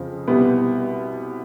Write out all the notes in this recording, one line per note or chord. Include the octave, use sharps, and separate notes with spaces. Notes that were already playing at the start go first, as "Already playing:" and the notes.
Already playing: F2 C#3 F3
C2 B2 G3 B3